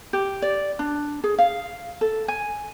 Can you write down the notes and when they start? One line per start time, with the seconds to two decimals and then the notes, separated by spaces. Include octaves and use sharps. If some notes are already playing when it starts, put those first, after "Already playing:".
0.13 G4
0.42 D5
0.79 D4
1.24 G#4
1.38 F5
2.01 A4
2.28 G#5